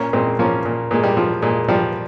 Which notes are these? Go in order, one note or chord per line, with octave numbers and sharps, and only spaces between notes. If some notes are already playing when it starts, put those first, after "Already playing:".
Already playing: A#2 A#3 C#4
A#2 G#3 C4
F3 A#3 C#4
A#2
A#2 G#3
G3
F3
A#2 G#3
F3 G3